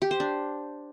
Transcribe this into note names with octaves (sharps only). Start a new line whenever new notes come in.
G4
C5
D4